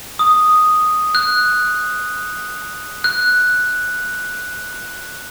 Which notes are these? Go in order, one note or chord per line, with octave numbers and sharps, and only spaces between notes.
D#6
F#6
F#6